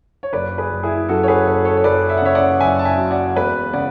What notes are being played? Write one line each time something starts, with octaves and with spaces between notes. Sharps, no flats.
C#5
F#1 B4 D5
G#4 B4
F#1
E4 G#4
F#2 F#4 A4
C#5
G#4 B4
F#1 A4 C#5
A4 C#5
C#5
F#1 B4 D5
E5
F#5
C#3 C#5 E5
D5 F#5
F#1 E5 G#5
A5
E5 G#5
F#2
D5 F#5
E1 B4 D5
C#3 D5 F#5